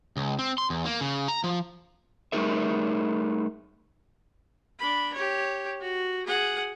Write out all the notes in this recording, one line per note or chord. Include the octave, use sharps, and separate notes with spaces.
C#2
C4
C6
E2
A#3
C#3
A#5
F3
G3 A3 D#4 G#4 A#4 E5
D4 B5
G4 C#5
F#4
G#4 F#5